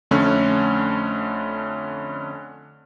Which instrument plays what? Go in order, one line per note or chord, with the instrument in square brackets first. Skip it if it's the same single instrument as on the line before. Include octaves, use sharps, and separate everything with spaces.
[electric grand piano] F2 D3 A3 C#4